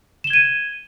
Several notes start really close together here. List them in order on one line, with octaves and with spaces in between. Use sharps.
E7 G7 G#6 D#7